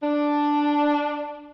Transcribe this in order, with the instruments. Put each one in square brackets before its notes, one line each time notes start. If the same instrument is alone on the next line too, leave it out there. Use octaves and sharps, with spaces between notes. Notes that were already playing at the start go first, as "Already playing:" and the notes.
[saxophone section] D4